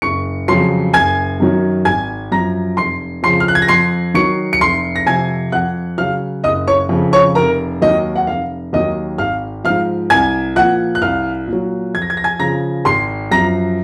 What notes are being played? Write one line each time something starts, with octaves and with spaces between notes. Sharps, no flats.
F#1 C#6 C#7
F2 C#3 F#3 C6 C7
F#1 G#5 G#6
F#2 D#3 F#3
G#1 G#5 G#6
F#2 F3 A#5 A#6
F1 C6 C7
F2 C#3 F3 C6 C7
F6
F#6
G#6
A#6
F2 C6 C7
D#3 F#3 C#6 C#7
C#7
F1 C6 C7
A#6
F2 C3 G#5 G#6
F2 F#5 F#6
C#3 F#3 F5 F6
F#1 D#5 D#6
C#5 C#6
F2 C#3 F3
C#5 C#6
F1 A#4 A#5
D#2 D#3 F#3 D#5
F#5
F1 F5
D#2 D#3 F#3 D#5 D#6
G#1 F5 F6
G#2 F3 F5 F6
C2 G#5 G#6
A#2 F3 F#5 F#6
F#6
C2 F5 F6
A#2 F#3
F2 G#6
A#6
G#6
A#6
G#5 G#6
C#3 F3 A#5 A#6
G#1 C6 C7
F#2 F3 A#5 A#6